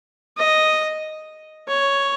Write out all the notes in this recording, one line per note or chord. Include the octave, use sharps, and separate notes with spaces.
D#5
C#5